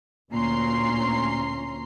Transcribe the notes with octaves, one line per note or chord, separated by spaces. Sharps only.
D2 A#2 C#4 A#5 C6 C7